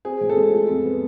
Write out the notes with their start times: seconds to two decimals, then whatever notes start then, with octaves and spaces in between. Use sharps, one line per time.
0.05 C4 G#4
0.21 A2
0.29 A4
0.37 G#3
0.53 F4
0.69 F2
0.85 B3